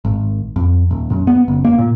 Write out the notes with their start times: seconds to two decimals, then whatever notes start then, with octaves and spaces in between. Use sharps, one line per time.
0.05 G#1
0.56 F2
0.91 D#1
1.12 F#2
1.27 B3
1.48 F#1
1.65 A#3
1.78 A#2